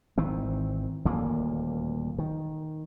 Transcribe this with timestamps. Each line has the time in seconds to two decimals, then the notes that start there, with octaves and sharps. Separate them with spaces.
0.18 G#1 D#3 E3 C4
1.05 D#1 D2 A#2 A#3
2.19 D#3